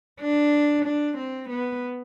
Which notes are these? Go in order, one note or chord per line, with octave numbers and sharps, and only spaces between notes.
D4
D4
C4
B3